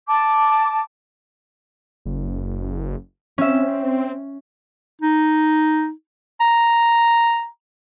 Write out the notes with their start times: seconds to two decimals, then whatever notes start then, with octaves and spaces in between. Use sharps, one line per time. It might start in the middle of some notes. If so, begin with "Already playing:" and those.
0.08 A5 D6
2.05 F#1
3.38 C4 C#4 E5
5.02 D#4
6.40 A#5